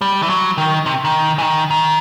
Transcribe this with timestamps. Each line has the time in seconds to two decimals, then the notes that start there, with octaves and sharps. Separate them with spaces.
0.01 G3
0.23 E3
0.30 F#3
0.58 D#3
0.86 C3
1.05 D#3
1.38 E3
1.43 D#3
1.71 D#3